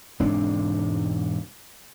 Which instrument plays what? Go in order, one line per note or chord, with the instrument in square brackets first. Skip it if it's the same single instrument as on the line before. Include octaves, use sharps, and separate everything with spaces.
[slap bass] E1 G#2 C4 D4